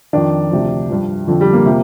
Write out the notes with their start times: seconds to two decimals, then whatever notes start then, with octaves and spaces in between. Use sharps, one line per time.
0.13 F2 D#3 D4
0.50 D2 C3 F3
0.89 G2 F3
1.27 F2 D3 F3
1.41 G3
1.53 A#3
1.65 C3 F3